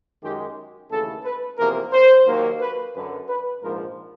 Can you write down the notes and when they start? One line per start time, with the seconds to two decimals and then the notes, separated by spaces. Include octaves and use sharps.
0.23 F#2 D#3 G#3 G4
0.90 D#2 C#3 E3 A3 A4
1.24 B4
1.58 E2 C3 F3 A#3 A#4
1.93 C5
2.27 D#2 D#3 F#3 A#3
2.61 B4
2.95 F#2 D3 F#3 B4
3.29 B4
3.62 A#1 G#2 F3 A#3 A#4